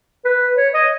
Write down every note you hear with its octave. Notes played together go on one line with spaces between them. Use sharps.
B4
C#5
D#5